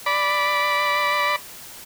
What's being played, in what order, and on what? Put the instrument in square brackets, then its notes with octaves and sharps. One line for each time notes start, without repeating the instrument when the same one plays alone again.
[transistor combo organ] D5 B5